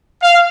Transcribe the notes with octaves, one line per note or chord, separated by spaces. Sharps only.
F5